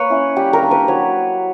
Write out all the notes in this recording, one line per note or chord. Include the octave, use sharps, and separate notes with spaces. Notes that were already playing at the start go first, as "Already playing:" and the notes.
Already playing: A#3 B4 C#5
C#4 E4
G3 G4
A#4
A#3 D4
B4
F#3 C#5